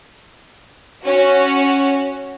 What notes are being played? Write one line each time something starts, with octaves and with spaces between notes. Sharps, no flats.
C#4 F#4